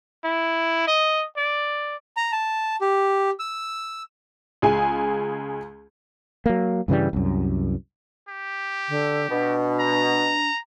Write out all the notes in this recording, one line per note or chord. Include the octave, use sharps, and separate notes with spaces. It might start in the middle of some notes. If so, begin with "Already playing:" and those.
E4
D#5
D5
A#5
A5
G4
E6
C#2 G#4 G#5
F#3 A#3
G2 C#3 E3 G3
C2 F#2
G4
D3
B2 D4
A#5